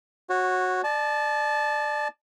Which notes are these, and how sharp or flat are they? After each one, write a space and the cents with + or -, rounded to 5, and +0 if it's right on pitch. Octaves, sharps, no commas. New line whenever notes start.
F#4 -5 C#5 -25
D5 +25 A5 -25